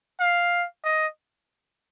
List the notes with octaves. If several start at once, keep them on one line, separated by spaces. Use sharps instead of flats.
F5
D#5